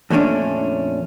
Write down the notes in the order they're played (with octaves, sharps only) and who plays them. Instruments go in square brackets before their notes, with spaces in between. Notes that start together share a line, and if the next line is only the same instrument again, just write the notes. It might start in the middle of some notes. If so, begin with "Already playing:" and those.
[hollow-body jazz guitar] F2 A#2 A3 C#4 D4